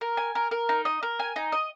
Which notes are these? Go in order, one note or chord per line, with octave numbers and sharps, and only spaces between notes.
A#4
G#5
A#4
A#4
D#4
D#5
A#4
G#5
D#4
D#5